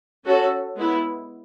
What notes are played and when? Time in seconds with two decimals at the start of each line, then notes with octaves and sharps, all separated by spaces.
0.24 C#4 F#4 A4
0.75 G#3 B3 E4